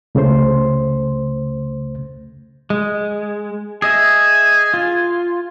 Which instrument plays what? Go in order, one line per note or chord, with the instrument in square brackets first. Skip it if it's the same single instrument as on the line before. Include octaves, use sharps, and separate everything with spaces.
[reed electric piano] C#2 C#3 A3 C5 C6
[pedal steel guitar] G#3
[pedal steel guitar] G#4 D#5 E5 [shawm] G#5
[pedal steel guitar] F4